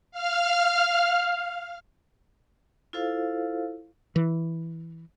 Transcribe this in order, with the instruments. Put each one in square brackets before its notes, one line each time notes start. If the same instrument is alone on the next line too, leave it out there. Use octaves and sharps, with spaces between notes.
[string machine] F5 F6
[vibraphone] E4 F4 A4 C5 F5
[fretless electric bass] E3